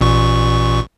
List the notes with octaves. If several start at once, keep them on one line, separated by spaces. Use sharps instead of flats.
A1 A#2 C#6